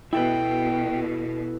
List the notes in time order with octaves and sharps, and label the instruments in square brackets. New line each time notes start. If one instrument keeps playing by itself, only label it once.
[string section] B2 [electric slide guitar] E4 A4 B4 [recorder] G5